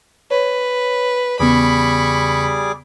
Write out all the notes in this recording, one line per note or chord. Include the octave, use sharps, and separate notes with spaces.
B4 C#5
E2 C#3 G3 B3 G#4 B5 C#6 D6